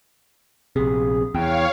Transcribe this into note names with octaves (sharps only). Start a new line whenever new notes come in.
A#1 C3 G#4
E2 C#5 F5 G5